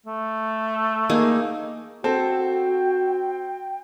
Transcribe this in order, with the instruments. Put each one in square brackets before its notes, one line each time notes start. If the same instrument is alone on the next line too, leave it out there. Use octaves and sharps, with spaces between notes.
[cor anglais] A3
[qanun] A#3 D#4 G#4
[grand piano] C4 [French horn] F#4 [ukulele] A4 [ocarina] G5